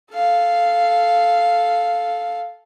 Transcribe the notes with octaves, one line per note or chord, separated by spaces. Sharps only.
A4 F5